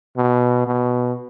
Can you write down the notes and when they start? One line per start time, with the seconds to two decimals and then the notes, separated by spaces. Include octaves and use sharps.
0.17 B2
0.67 B2